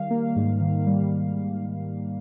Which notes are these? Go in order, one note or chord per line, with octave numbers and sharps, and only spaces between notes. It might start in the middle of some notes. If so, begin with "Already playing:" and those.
Already playing: D#3 G3 F5
A#3
G#2
D#3
G3